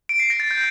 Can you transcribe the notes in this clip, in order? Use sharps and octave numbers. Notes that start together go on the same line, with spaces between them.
D7
C7
A#6
A6
G6